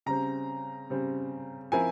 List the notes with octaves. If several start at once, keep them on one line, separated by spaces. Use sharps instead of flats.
C#3 G3 C4 A#5
C#3 G3 C4
F3 C4 E4 A#4 G#5